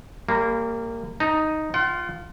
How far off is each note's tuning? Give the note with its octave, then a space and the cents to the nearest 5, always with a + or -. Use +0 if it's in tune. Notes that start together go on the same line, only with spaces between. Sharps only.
G3 +25 A#3 -20
D#4 +0 A5 +40
F4 +0 F#5 +45